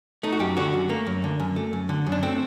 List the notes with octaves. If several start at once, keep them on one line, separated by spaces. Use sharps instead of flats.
A3 D#4
F#4
F#2 G4
D3 F#4
F#2
A3 A#3
F#2
D3
F#2
A3
F#2
D3
F#2
D4
A3 C4